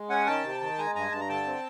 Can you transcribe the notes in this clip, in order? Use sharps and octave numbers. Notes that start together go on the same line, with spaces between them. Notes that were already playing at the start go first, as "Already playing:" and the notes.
Already playing: G#3
C#4 F#5 G#5
D#3 G5 A5
C3
D#3
G#3 G#5 A#5
G2 G#5 A#5
G2 A5
A#5
D3 G5 A5
C4